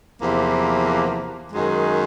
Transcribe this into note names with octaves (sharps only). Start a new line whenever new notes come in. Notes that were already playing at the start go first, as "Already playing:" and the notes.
E2 C3 F3 A#3
F#2 D#3 G#3